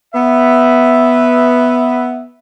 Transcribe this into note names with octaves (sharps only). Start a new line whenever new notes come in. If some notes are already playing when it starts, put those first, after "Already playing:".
B3 E5